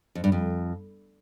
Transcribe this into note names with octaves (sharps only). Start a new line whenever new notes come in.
F2
G2
F2